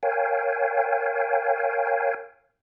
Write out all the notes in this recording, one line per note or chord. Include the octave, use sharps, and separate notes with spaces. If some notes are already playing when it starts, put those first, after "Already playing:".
A#4 C#5 F5 G5 G#5